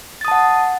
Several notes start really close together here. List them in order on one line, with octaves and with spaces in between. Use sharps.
A6 D#6 A5 F#5